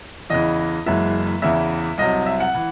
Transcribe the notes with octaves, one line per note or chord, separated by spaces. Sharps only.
E2 C#3 E3 D#5
F#1 F#2 E3 G#3 E5
E2 C#3 E3 E5
C2 C3 F#3 D#5
E5
F#5
E3